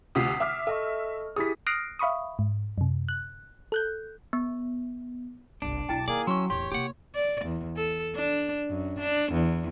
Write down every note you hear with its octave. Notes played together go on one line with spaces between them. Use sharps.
D2 C3 F4 D#6 B6 C7
E5 D6 F6
A4 D#5 E5 C#6
E4 G4 G#4 D#6 B6
D#6 F6 F#6 A#6 C7 D7
E5 F5 B5 C#6 D#6
G#2
F#2 C3
F#6
A4 F#6 G6
B3
G1 C2 D4
B1 E4 G5 A5 D6
D#3 A#3 G#4 D5
F#3 C#4 C6 C#6 E6
D1 E2 G4 C#5 C6
C3 A#3 G4 F#5
D5
E2
A4
D4
F#2
D4
E2